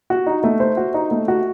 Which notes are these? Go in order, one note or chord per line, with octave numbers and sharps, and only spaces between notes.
F#4
D#4
A3
C5
F#4
D#4
A3
F#4